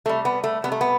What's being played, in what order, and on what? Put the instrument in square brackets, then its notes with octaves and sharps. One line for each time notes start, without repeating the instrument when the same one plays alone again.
[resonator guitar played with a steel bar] C3 G3 A3
B3
A3
C3 G3 B3
A3
B3